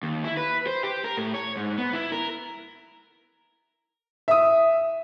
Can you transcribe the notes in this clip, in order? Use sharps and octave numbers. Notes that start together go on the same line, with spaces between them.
D#2
E4
B4
C5
G4
A#4
A2
C#5
G#2
B3
E4
A#4
E5 D#6